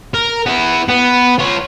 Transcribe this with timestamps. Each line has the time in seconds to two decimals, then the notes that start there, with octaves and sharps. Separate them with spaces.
0.14 A#4
0.46 B3 E4
0.88 B3
1.39 F4 C#5